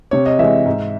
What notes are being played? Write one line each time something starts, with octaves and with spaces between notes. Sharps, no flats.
C3 C#5
D#5
E3 G#3 E5
G#2